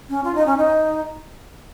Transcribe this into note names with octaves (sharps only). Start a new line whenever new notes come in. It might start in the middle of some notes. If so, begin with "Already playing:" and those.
C#4
F4
D#4
C#4
D#4